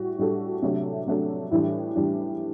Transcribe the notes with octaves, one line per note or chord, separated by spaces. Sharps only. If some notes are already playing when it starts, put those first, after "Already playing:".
Already playing: A2 G3 F#4
A2 G3 D4 F#4 A4
C3 F#3 A3 D4 A4
C3 F#3 A3 D4 A4
A2 E3 G3 D4
A2 E3 G3 D4